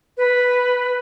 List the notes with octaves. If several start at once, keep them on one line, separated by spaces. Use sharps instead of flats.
B4